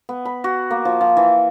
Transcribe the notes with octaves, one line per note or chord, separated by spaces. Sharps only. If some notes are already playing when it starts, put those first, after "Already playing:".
B3
B5
F#4
A#3
F3
F3
E3